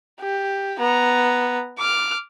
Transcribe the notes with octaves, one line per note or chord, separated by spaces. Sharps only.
G4
B3 A#5
D6 F6